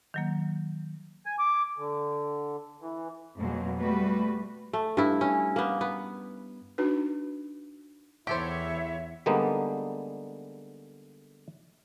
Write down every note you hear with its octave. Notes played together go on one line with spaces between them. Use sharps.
D#3 F#3 A#3
G#5
D6
D3
E3
F2 B2 F#3 G#3 A#3
G3 A3 F#4 B4
A3
G2 E4
C#4
A#3 B3
B3
D4 D#4 F#4 B4
E2 E4 G4 A4 C5 C#5 E5
D3 G3 G#3 A#3 B3 D#4